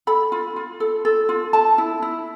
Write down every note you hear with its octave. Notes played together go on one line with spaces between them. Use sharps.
A4 B5
F4
F4
A4
A4
F4
A4 A5
E4
E4